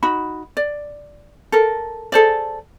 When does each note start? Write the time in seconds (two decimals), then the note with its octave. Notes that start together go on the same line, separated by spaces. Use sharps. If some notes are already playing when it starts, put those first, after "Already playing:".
0.03 D#4 F#4 B5
0.57 D5
1.52 A4 A#4
2.12 G#4 A4 C5 D5